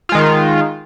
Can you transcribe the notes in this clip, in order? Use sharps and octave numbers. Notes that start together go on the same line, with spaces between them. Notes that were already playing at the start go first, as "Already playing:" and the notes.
D#3 G#3 F4